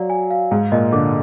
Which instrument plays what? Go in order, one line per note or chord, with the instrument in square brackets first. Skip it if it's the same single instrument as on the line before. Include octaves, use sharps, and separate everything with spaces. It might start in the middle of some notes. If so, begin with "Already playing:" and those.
Already playing: [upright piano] F#3 [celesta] F#4 D5 F5
[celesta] G#5
F5
[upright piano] G#2 [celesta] G#4
[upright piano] A#2 [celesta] D#5
[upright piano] D3 [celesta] D6